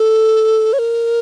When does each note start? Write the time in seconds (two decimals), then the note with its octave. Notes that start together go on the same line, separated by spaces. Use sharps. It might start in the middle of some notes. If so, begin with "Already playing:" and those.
Already playing: A4
0.73 C#5
0.79 A#4